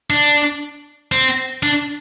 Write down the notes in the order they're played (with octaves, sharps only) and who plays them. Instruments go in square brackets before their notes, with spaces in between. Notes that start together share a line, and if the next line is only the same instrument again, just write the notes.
[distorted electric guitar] D4
C4
D4